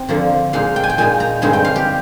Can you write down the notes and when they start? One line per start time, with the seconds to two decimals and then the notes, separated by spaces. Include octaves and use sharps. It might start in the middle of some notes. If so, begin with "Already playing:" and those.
Already playing: C4
0.09 D3 F3 A#3
0.53 A#2 G#3 D#4 F5
0.76 G5
0.83 G#5
0.90 G5
0.98 A#2 G#3 D#4 G#5
1.20 A#5
1.42 G2 D3 G#3 C4 D#4 G#5
1.53 G5
1.64 F5
1.76 G4